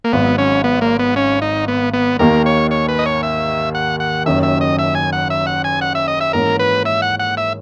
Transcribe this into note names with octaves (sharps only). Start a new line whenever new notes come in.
A#3
G#1 G#2 F#3 B3
C#4
B3
A#3
B3
C#4
D#4
B3
B3
D#2 D#3 A#3 A#4
C#5
C#5
B4
D#5
C#5
E5
F#5
F#5
F#1 F#2 D#3 E5
E5
D#5
E5
G#5
F#5
E5
F#5
G#5
F#5
E5
D#5
E5
G#2 E3 A#3 C#4 A#4
B4
E5
F#5
F#5
E5